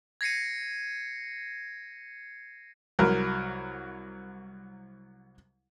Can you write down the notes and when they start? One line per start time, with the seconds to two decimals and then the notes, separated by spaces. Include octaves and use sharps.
0.21 G#6 A#6 C7 C#7 D#7
2.99 C2 F#3 A#4